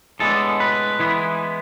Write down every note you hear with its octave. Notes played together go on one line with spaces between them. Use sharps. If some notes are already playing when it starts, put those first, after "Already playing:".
A2 G#3 B3 D4 A4
B4
E3 G#3 B3 E4